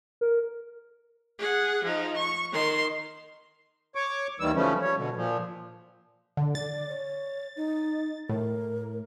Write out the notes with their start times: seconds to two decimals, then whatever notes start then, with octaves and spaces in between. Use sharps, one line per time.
0.21 A#4
1.39 G#4 F#5
1.84 F3 D#4
2.16 C#6
2.52 D#3 C6
3.95 C#5 C#6 D6
4.40 D#2 D#3 E3 G3 E6
4.55 C#3 E3 F3 G3 A3 C#4
4.82 G3 C#5
4.96 B2 D3
5.16 A#2 F3
6.37 D3
6.55 D5 A6
6.89 C#5
7.56 D#4
8.29 A2 A#4